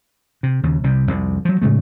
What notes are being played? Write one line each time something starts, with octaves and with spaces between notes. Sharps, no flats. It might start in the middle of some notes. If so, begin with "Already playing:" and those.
C3
D#2 C#3
C2 C3
C2 F2 C3
F3 F#3
A2 C#3 G#3 A3